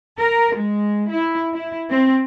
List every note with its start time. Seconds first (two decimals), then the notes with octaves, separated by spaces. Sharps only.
0.20 A#4
0.55 G#3
1.11 E4
1.54 E4
1.90 C4